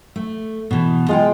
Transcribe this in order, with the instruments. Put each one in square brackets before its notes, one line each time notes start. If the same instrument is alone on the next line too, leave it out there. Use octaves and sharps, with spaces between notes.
[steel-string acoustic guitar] A3
B2 E3
[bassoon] G#3 [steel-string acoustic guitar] F4 F#5 G5